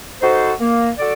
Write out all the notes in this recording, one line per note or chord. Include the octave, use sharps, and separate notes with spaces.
D#4 F#4 A4 C5
A#3
F#4 A4 D5